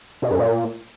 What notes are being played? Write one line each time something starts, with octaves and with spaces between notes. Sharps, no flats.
B2
F#2
A#2